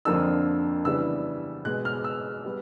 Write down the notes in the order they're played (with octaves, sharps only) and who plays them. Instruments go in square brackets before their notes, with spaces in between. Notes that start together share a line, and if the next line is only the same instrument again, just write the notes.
[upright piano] F2 D3 F3 A#3 D4 E6
C#3 E3 G3 B3 D4 E6
B2 G#3 B3 F#6
F6
E6
G3 B3